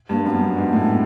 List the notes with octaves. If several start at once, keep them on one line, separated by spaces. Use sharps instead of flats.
G2 A#3
F#2 C4
B3
G2
G#2
A2